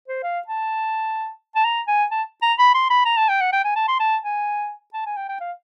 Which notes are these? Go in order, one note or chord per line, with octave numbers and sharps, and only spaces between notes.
C5
F5
A5
A5
A#5
G#5
A5
A#5
B5
C6
B5
A#5
A5
G5
F#5
G5
G#5
A5
C6
A5
G#5
A5
G#5
G5
G5
F5